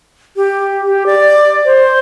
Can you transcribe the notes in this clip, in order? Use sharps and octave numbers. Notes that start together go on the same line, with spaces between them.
G4
G4
D5
C5